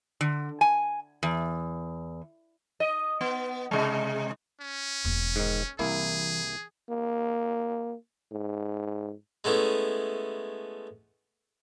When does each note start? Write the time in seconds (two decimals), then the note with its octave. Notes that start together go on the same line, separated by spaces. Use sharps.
0.21 D3
0.61 G#5
1.23 E2
2.80 D#5
3.21 B3
3.71 C3 G#3
4.61 C#4
5.05 E1 E2
5.36 G#2 D#3
5.79 C2 E3 A#3 E4 G#4
6.90 A#3
8.31 G#2
9.44 G#3 A3 B3 C#4 E4